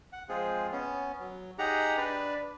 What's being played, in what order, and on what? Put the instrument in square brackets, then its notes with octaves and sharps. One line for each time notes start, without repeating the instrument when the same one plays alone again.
[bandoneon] F#5
F3 G#3 C4 F4 G#4
B3 C#4
F#3
D#4 G4 G#4 F#5 A#5
D4 B4 D5